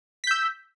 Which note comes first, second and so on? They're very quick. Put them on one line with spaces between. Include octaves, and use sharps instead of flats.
B6 G6 E6